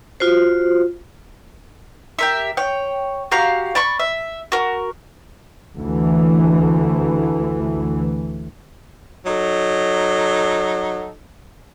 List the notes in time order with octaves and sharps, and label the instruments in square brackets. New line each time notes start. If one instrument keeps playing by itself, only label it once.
[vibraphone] F4 F#4 C5
[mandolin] G4 A#4 E5
C#5 G5
F#4 G4 F5 A#5
D5 B5 C#6
E5
F#4 A#4
[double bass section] D2 E3
[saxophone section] F#3 D#4 A4